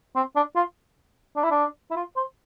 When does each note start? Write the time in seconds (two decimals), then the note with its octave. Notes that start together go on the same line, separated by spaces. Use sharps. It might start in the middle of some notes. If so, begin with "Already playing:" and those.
0.16 C4
0.36 D4
0.56 F4
1.36 D4
1.44 E4
1.51 D4
1.91 E4
1.96 F4
2.16 C5